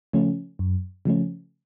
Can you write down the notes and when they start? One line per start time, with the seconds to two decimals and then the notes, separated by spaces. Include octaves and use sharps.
0.13 C#3 F3 A3 C#4
0.59 F#2
1.05 C#3 F3 A3 C#4